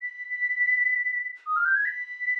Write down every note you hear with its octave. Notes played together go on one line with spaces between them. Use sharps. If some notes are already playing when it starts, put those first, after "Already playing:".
B6
D#6
F6
G6
G#6
B6